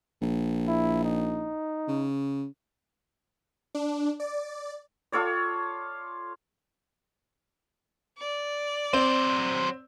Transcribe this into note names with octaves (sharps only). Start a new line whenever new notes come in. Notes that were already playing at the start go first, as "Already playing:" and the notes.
A#1
E4
D#4
C#3
D4
D5
F4 A4 C#5 D5
D5
F#3 C4 C5